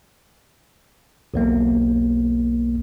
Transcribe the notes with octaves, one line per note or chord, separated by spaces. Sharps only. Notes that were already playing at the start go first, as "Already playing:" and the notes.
B1 E2 A#3